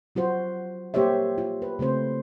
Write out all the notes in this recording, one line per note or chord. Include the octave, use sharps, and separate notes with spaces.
F#3 F4 F#4 C5
A#3 G4 C5 C#5 E5
F4
B4
C#3 A3 C4 C5